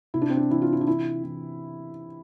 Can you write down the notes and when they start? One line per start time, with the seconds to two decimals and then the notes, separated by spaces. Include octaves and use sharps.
0.14 C3 E4
0.22 D4
0.30 C4
0.37 D4
0.51 E3 E4
0.62 F4
0.73 E4
0.81 D4
0.87 E3 E4
1.24 E3